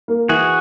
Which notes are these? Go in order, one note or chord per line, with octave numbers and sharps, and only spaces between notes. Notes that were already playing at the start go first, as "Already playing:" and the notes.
A#3
E3 F#4 G#4